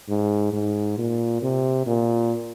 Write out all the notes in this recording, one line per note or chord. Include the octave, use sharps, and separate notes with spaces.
G#2
G#2
A#2
C3
A#2